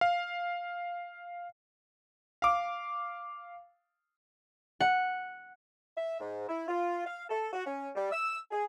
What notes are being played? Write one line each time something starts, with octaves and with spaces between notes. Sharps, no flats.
F5
F5 D6
F#5
E5
G#2
E4
F4
F5
A4
F#4
C#4
G3
E6
G#4